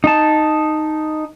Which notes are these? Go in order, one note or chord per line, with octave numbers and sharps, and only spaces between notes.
D#4 A5